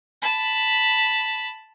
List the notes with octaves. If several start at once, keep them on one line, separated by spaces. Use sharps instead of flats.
A5 B5